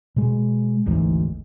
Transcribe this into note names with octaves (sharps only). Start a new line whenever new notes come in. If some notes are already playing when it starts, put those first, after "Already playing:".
B2 G#3
G#1 D2 G#2 E3